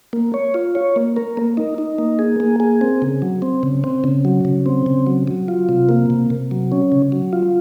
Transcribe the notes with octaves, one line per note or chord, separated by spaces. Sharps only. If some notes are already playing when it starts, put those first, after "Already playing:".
A#3
C#5
F4
C#5
A#3
A#4
A#3
D#4
D#4
A#3
G#4
A#3
G#4
C4
C#3
F#3
C4
C#3
C4
C#3
F#3
C#3
C4
C#3
F#3
F#3
F4
C3
A#3
C3
C3
F#3
C#4
C#3
F#3
F4